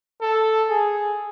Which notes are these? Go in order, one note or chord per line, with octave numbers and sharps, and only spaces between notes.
A4
G#4